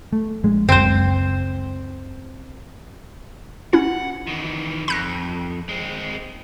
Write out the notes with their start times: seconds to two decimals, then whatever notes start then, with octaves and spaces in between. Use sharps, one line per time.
0.13 A3
0.44 A#1 G#3
0.69 F#1 C#2 C4 C5
3.73 C#4 E4 F#5
4.27 D#3 E3
4.88 F2 B5 F#6 A#6
5.69 G#3 C4